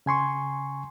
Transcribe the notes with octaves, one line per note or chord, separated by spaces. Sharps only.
C#3 G#5 C6 C#6